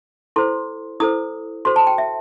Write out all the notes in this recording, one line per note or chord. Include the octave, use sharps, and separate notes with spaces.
E4 A4 C5 C6
E4 A4 C5 D#6
F#4 A4 C5 C6
A5
G5
E5